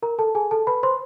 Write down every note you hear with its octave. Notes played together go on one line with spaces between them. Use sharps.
A#4 A#5
A4 A5
G#4 G#5
A4 A5
B4 B5
C5 C6